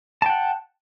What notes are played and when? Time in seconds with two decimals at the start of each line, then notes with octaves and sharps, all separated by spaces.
0.22 A5
0.26 G5
0.30 F#5